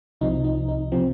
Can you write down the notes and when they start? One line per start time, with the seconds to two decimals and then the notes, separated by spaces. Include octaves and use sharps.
0.21 C2 C3 F3 D#4
0.44 D#4
0.69 D#4
0.92 C3 F3 C4